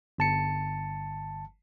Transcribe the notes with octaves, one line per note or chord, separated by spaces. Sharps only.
G1 A5 C#7